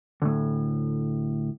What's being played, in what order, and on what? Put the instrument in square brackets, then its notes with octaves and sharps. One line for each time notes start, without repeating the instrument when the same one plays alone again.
[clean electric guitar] D2 A2